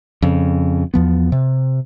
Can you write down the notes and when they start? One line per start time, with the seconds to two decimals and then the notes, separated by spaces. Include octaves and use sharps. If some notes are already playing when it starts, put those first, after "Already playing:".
0.22 F2 C#3
0.94 E2 F3 B3
1.32 C3